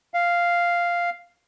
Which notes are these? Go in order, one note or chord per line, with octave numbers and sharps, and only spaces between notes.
F5